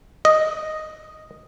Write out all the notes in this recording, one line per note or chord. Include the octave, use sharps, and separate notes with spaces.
D#5